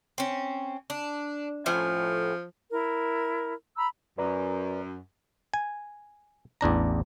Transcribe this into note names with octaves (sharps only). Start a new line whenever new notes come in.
C4 C#4
D4
A2 F3 C#4 G#5
E4 A#4
A#5 B5 E6
F#2 B4 D5 A#5
G#5
A1 E2 D4 A#5